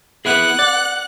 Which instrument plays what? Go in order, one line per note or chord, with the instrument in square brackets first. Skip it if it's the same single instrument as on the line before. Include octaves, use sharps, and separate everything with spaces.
[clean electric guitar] B3 E4 G#4 [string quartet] F#5 F#6
[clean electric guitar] D5